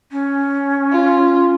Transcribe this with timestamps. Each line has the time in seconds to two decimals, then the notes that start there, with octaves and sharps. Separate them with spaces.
0.11 C#4
0.92 F4